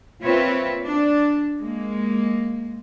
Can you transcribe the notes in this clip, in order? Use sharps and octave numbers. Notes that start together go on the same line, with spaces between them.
A#2 C4 F4 B4 C#5 E5
D4
G#3 A#3